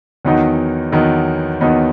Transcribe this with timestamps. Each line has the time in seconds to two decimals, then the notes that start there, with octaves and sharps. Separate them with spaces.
0.25 E2 D#3 F#3 B3 D#4
0.92 E2 D#3 F#3 B3 D#4
1.61 E2 D#3 F#3 B3 D#4